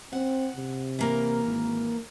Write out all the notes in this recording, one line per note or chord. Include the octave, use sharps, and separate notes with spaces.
C4 F#5
C3
E3 A#3 A#4
G#1